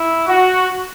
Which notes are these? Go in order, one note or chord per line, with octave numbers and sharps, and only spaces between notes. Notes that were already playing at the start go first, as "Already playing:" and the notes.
Already playing: E4
F#4